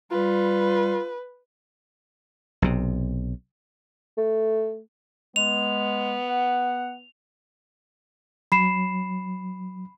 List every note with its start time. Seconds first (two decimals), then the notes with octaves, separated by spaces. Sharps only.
0.12 G3 F4 B4
2.62 B1 C3
4.18 A3
5.36 G#3 B3 F7
6.29 F#5
8.52 F#3 B5 C7 E7